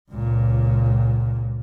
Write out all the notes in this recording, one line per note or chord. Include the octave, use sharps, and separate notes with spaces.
C#2 A#2